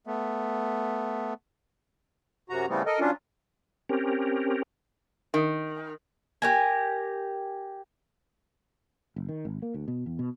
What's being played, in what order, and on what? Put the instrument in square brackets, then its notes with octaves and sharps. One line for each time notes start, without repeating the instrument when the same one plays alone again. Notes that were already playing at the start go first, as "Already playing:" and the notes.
[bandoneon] A3 B3
[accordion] F#2 C3 F#4 A#5
C#3 E3 G3 A3 B3 C4
A4 A#4 D#5
F#3 C#4 D4 F4
[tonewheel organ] C4 C#4 G4 A#4
[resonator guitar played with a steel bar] D#3
[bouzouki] G4 A#4 G#5
[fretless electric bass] F#1
D#3
G#1
A#3
D2
B2
E2
B2